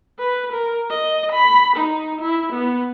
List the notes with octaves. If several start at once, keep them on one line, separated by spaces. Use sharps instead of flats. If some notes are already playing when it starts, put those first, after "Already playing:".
B4
A#4
D#5
B5
D#4
E4
B3